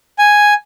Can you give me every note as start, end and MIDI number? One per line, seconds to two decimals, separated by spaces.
0.18 0.54 80